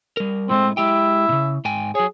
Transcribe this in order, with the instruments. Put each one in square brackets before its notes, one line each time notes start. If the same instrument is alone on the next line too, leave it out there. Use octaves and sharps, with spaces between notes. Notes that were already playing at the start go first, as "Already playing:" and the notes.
[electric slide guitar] G3 A#4
[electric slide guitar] A2 G#3 A3 [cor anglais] C4
[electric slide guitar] G#3 G4 G5 [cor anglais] E4
[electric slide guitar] A#2 C#3
G#2 G5 G#5
[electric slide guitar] F#3 C#5 [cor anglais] G#4